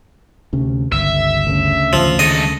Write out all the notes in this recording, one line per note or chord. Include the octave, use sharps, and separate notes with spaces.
D2 C3 C#4
G1 C#2 E5
D2 C#3
A1 D#3 F3
D#3 G#3 A4 D#5